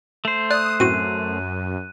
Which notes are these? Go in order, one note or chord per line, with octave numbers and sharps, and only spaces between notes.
A3 C5
D5 D#6 F#6
F#2 A2 C4 F#4 D#7